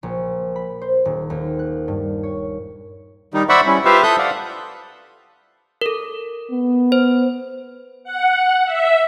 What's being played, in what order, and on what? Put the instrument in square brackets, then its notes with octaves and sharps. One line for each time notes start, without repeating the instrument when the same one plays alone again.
[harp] A#1
B5
C5
D#1
D#2
F#6
G2
C#5
[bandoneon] D#3 G3 D#4
C5 D5 E5 F#5 B5 C#6
G3 C#4 E4
F4 G4 B4 C5 E5 F5
A4 E5 D#6 F#6 G6
D5 F5 F#5
[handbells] A4 A#4
[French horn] B3
[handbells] C5
[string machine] F#5
E5